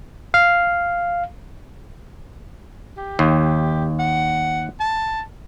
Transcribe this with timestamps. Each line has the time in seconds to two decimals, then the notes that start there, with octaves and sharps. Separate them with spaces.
0.34 F5
2.97 G4
3.19 D#2
3.99 F#5
4.80 A5